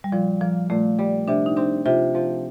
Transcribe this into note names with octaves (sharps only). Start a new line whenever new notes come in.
G3
A#2 F3
F3 A#3
A#2 A3
G3
C3 D4
D#4
C4 D4
C3 F4
F3